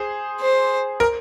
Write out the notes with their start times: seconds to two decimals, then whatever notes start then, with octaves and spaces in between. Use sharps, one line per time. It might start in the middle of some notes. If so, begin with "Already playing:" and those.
Already playing: G#4 C5
0.41 C5
1.00 A#4